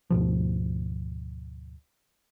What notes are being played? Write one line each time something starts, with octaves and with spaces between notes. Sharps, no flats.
D2 G#2 B2 F3